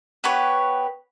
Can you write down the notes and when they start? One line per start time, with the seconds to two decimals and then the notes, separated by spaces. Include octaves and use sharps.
0.24 B3 G4 B4 C#5